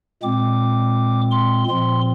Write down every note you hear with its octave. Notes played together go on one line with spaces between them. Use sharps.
A#2 G#3 C4 D6
C6
A#2 F3 C4 C6